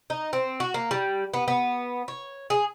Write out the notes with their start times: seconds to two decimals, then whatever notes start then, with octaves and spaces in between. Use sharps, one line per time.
0.10 D#4
0.33 C4
0.60 F#4
0.74 A#3
0.91 G3
1.34 B3
1.48 B3
2.08 C#5
2.50 G#4